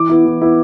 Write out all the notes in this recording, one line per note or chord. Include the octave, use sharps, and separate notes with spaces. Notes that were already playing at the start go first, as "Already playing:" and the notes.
Already playing: E3 D6
B3 E4
E3
B3 E4